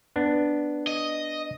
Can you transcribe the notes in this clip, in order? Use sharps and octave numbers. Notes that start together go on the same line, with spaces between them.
B3 D4
D#5